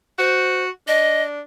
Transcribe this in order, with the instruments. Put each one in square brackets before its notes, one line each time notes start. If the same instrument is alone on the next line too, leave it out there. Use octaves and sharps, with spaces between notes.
[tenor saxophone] F#4 [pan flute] C5
[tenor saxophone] D4 [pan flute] D#5